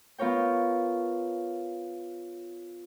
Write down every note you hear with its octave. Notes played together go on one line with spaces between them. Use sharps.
B3 F4 A#4 C#5 G5